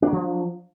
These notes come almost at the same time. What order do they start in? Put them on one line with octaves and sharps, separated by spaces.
D4 F#3 F3